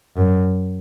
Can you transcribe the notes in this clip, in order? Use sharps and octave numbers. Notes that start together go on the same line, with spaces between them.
F#2